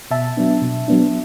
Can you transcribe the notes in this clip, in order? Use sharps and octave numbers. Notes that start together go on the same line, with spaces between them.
B2 E5 A5
F#3 B3 D4
B2
F#3 B3 D4